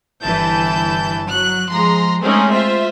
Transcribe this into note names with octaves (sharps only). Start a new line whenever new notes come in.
G1 E3 E4 A5 G6
F#3 F#6
F3 G#3 A#5 C6
G#3 A3 C4 C#4 D#4 G#4
F4 C5 E5